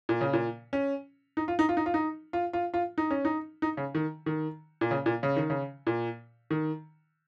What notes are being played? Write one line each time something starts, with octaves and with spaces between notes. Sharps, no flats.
A#2
C#3
A#2
C#4
D#4
F4
D#4
F4
D#4
F4
D#4
F4
F4
F4
D#4
C#4
D#4
D#4
C#3
D#3
D#3
A#2
C#3
A#2
C#3
D#3
C#3
A#2
D#3